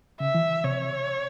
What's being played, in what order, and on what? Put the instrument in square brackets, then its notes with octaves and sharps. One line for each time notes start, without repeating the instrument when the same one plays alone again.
[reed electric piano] C#3 [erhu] E5
[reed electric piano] E3
[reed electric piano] C3 [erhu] C#5